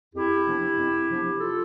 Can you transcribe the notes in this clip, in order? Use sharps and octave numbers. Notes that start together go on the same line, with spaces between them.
F2 E4 G4
C3 F3 B3 D4
F2
C3 F3 B3 D4
F4 A4